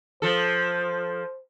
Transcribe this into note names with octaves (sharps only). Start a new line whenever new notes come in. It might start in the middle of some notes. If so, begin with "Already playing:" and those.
F3 A4 C5